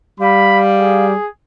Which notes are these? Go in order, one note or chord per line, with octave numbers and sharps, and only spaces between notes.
G3 F5 B5
G#4